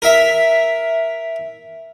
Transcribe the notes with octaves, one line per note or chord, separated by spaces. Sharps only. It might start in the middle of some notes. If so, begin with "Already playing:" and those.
A#4 E5